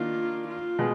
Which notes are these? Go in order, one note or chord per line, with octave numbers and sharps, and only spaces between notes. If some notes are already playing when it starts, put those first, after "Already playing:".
Already playing: D#3 A#3 D4 F4
F4
B2 G#3